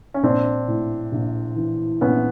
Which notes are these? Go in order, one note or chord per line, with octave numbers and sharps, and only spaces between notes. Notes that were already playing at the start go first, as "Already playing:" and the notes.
C#4
A#1 C4 D4
A2
A#1
E3
A#1 B3 C#4